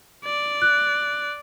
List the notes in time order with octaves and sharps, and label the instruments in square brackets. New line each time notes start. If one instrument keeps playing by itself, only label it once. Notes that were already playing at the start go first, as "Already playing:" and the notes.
[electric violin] D5
[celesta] F#6